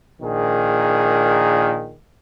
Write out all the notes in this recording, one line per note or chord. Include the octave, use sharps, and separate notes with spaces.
A#1 A#2 D#3 G#4